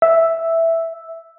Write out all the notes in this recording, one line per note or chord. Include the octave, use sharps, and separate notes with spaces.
E5